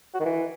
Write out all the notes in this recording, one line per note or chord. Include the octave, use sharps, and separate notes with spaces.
F#4
D#3
E3